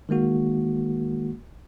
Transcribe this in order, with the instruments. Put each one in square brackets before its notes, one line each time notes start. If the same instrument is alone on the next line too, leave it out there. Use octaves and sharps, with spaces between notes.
[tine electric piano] D#3 G#3 A#3 F#4